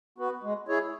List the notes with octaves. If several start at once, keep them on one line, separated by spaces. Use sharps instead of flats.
B3 F#4 B4
G#3
E4 G#4 C#5